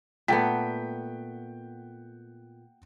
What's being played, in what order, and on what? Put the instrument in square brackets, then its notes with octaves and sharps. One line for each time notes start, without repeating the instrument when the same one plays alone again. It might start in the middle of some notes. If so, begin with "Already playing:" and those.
[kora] A#2 A3 B3 [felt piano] F#5 G5 B6